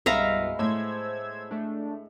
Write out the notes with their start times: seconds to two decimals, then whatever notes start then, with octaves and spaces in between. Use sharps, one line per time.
0.06 C2 G2 B2 G#3 B3 E5 F5 A#5
0.59 A2 C5 E6 G#6
1.51 A3 D4